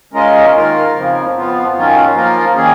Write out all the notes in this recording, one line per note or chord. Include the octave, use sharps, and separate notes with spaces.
G#3 C#4 F4 A#4 D#5
D#3 A#3 F4 A#4
F2 C#3 F3
F2 F3 B3 F4
F#2 D#3 F#3 C#4 F4
F3 A#3 F4 A#4
D#3 A#3 C#4 G#4